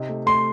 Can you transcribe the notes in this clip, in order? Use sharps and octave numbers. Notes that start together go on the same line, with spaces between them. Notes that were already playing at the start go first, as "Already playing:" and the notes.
Already playing: C3 D#4
A3
A3 C6